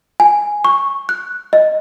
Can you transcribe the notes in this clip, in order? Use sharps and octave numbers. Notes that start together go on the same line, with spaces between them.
G#5
C#6
F#6
D#5